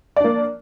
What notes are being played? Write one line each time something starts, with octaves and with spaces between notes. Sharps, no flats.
A#3 D4 D5